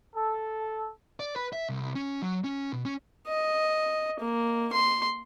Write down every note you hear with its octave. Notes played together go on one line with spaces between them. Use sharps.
A4
D5
B4
E5
C2
C#4
F#3
C#4
B2
C#4
D#5
A#3
C6